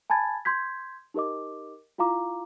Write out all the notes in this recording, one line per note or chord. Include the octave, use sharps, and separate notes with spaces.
G#5 A5 B5 G#6 A6
C6 G6 G#6 B6
D#4 G4 A#4 D#5 D6
E4 F4 F5 A#5 D6